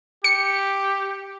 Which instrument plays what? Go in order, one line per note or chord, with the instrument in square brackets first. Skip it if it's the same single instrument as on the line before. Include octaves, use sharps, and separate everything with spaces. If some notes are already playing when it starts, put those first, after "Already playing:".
[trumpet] G4 [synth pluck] C#7